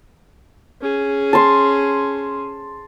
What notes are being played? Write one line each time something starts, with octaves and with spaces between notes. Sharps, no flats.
C#4 G#4
A5 C6